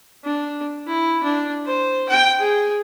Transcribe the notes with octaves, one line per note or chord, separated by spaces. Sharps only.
D4
E4
D4
C5
G5
G#4